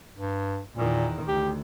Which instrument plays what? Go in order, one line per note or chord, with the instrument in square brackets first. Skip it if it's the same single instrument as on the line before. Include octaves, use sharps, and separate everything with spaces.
[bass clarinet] G2
[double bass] E2 D#3 [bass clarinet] A#2
[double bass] D2 [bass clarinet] G4